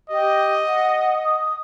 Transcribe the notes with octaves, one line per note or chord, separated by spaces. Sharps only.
G4 D#5
F#5
D#6